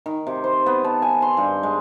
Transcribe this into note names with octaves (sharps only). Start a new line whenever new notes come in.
D#3
C3
C5
B3
A5
G#5
C6
G2
G#3